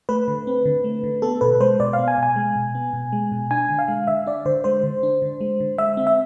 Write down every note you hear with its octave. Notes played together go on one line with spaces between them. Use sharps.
A3 B4
D3
C4
D3
A3
D3
B3 A4
B2 B4
G#3 C5
B2 D5
F5
B3
G#5
B2 G#5
G#3
B2
B3
B2
G#3
B2
D4 G#5
D3
F5
G#3
D3 E5
D4 D5
D3 C5
G#3 C5
D3
D4
D3
G#3
D3
G#3 E5
C4
E5